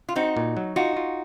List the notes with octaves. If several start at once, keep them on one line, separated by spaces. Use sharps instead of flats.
F4
C4 D#4 F#4
A#2
F#3
D#4 F4 F#4
F4